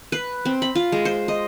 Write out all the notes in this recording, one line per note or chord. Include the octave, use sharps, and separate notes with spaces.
B4
C4
B5
F4
G#3
C5
D#5